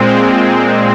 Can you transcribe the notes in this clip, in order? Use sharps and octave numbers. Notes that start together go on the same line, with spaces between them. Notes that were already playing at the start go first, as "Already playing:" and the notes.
Already playing: A#2 G#3 C4